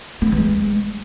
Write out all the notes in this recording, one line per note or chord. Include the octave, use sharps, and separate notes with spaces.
A#3
C4
E3
G#3